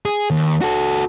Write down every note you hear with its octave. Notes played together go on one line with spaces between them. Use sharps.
G#4
D#2
F#4 A4